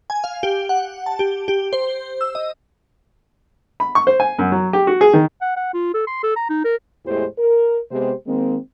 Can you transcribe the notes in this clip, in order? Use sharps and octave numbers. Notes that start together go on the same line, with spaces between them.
G#5
F5
G4
F#5
A5
G4
G4
C5
E6
D#5
B5
C#6
C5
G#5
F#2
F#3
G4
F#4
G#4
D#3
F#5
F#5
F4
A4
C6
A4
A#5
D#4
A#4
E2 A2 E3 G#3 G4 C5
A#4
C3 G#3 B3 G4 C5
D#3 G#3 A#3 C4